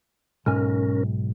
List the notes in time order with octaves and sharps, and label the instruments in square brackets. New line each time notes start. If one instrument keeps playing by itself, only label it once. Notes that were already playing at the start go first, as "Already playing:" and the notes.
[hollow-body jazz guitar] B1 G#2 G#5 [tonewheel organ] C#4 A#4